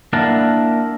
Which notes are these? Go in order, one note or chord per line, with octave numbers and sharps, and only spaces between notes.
A#3 D4 E4 A#4 F#5 A5